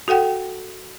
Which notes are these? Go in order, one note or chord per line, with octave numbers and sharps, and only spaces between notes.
F#4 A4 F#5 G5